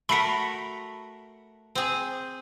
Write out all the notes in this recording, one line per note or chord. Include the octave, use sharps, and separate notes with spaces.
A3 F#4 A#4 B5 B6
C4 G#4